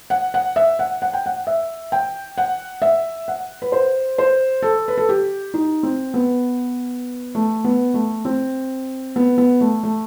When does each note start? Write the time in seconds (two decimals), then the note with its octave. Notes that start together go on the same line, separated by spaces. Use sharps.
0.10 F#5
0.34 F#5
0.56 E5
0.79 F#5
1.02 F#5
1.14 G5
1.26 F#5
1.47 E5
1.92 G5
2.38 F#5
2.82 E5
3.28 F#5
3.62 B4
3.72 C5
4.18 C5
4.62 A4
4.88 B4
4.97 A4
5.09 G4
5.54 D#4
5.83 C4
6.14 B3
7.35 A3
7.64 B3
7.94 A3
8.25 C4
9.16 B3
9.38 B3
9.61 A3
9.83 A3